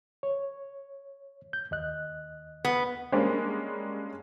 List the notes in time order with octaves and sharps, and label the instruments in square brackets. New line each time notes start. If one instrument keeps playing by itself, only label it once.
[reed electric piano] C#5
G6
D#2 D#5 F#6
[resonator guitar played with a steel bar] B3
[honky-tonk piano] G3 G#3 A#3 C#4 D4